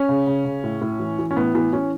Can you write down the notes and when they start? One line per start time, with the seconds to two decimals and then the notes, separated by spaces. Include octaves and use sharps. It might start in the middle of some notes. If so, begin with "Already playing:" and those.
Already playing: C#4
0.09 C#3
0.27 C#3
0.45 C#3
0.64 A2
0.81 A2
1.00 E3
1.19 E3
1.31 C#4
1.36 A2 B3
1.55 E3 B3
1.73 E3 C#4